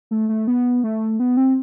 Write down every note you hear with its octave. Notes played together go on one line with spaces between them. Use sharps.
A3
A3
B3
A3
B3
C4